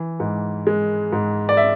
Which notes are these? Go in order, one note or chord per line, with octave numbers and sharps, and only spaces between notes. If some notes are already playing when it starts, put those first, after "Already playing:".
Already playing: E3
G#2
G#3
G#2
D5
E5